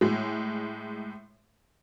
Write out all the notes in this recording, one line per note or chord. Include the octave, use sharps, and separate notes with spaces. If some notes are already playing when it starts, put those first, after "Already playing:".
A2 G#3